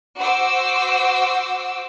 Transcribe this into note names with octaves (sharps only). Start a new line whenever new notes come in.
F#4 C5 D6 E6